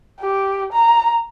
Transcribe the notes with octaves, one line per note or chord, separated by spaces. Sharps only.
G4
A#5